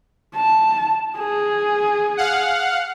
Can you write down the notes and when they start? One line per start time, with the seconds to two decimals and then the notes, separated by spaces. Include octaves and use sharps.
0.36 A5
1.18 G#4
2.17 F5 F#5